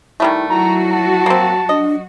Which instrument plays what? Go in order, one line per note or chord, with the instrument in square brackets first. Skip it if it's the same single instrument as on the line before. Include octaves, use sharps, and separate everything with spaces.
[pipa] D#3 G3 A3 [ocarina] E4
[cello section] F#3 F#4 [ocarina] E4 [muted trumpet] A#5
[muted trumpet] A5
[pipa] A#3 C4
[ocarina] D4 [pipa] D#5